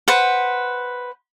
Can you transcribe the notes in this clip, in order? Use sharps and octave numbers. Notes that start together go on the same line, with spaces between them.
B4 C5 F#5